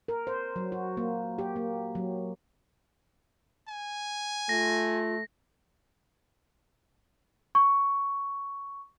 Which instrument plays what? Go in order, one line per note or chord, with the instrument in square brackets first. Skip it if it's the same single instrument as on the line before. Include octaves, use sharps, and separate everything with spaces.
[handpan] A#4
C5
F#3
F#4
A#3
G4
A#3
F#3
[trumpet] G#5
[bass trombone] A3 [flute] F4 [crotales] A#6
[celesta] C#6